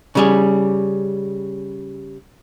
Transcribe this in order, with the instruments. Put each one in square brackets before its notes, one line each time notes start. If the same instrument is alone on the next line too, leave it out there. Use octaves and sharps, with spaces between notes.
[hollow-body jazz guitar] C#3 G3 G#4